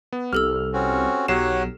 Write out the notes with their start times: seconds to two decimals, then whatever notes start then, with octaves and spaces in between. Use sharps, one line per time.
0.13 B3
0.33 C2 G4 A4 E6 F6
0.73 C4 C#4 F#4
1.28 B1 F#3 G4 C#5 F#5 C7 E7